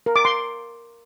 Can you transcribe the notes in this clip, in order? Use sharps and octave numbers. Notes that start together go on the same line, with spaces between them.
A#4
D6
C6